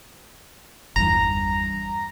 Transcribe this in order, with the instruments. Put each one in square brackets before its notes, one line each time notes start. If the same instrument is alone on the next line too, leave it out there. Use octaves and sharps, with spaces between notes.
[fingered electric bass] G1 E2 G2 [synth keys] A#5